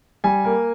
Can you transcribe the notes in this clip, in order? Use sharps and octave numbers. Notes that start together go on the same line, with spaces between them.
G3 G#5
A#3